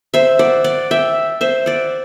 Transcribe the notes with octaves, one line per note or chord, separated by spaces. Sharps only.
C5 E5
D5 F#5
D5 F#5
E5 G5
C5 E5
D5 F#5